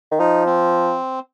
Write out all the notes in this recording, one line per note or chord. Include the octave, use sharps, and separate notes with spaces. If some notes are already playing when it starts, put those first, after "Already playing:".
D#3
F3 D#4
C4